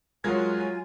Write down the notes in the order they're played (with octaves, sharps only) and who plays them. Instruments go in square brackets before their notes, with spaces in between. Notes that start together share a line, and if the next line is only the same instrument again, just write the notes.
[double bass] F#3 [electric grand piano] G#3 A#4 G#6 [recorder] F4 [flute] G#5